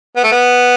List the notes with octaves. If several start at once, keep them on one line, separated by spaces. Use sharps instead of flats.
B3
A3
B3